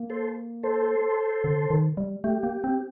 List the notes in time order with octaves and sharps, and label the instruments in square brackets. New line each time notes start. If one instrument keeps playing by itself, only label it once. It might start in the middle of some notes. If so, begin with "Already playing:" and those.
Already playing: [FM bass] A#3
[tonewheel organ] A4 C5
A4 C5
[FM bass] D3
D#3
G3
[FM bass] A3 [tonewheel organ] G4
[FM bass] A#3
C4